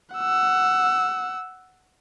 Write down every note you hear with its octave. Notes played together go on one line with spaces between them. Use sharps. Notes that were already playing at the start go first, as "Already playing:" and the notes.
F#5 E6